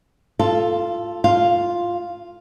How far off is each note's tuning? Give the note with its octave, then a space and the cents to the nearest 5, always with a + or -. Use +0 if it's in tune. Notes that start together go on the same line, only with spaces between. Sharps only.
F4 +0 A4 +0 F5 -30
F4 +0 F5 +0